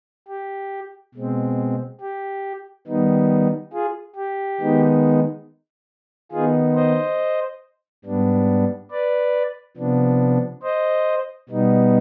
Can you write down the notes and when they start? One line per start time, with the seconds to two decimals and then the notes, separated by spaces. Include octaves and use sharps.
0.28 G4
1.15 B2 G#3 C4
2.01 G4
2.87 D#3 G3 B3 D#4
3.73 F4 G#4
4.16 G4
4.60 D#3 G#3 B3 D#4
6.31 D#3 B3 D#4 F4 G#4
6.75 C5 D#5
8.05 G#2 G3 B3 D4
8.91 B4 D5
9.77 C3 F3 B3 D4
10.63 C5 D#5
11.49 B2 G3 B3 D#4